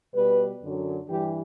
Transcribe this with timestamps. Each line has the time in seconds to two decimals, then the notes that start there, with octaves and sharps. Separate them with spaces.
0.15 B2 G3 B4
0.62 F#2 D3 F#3
1.07 G2 E3 G3 G4